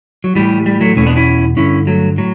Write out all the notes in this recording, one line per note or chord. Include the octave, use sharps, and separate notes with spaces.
F#3
A2 E3 G3
G3
F#3 A3
E2 B2 A3 C#4
B3 D4
C#4 E4
G2 D3 C#4 E4
F#3 A3
A2 F#3